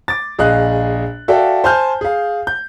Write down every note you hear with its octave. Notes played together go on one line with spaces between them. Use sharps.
D6 A6
A#1 G#4 D#5 F5 F#6
F#4 A4 D5 E5 F5 G5
C5 G#5 A5 F6 G6
G#4 F5
G6